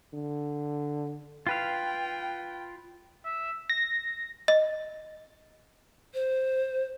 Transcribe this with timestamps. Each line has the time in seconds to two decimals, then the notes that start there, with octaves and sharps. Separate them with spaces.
0.14 D3
1.47 F4 B4 F5 G5
3.25 E5
3.70 A#6
4.48 D#5
6.14 C5